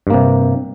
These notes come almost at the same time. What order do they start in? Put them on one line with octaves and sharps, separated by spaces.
G2 A#3 C3